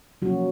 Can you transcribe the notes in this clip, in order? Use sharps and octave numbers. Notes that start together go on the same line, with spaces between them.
C3 F3 F#3 A#3 C#4 F#4